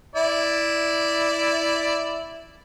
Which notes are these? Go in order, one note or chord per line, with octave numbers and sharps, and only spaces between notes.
E4 D5